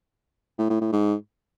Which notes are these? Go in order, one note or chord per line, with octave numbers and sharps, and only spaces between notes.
A2
A2
A2
G#2